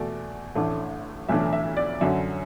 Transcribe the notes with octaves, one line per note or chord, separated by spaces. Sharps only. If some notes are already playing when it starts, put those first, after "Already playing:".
Already playing: E2 B2 A3 D5
A1 A2 A3 D4
B1 A2 E3 A3 D4 E5
E5
D5
F#2 D3 F#3 E5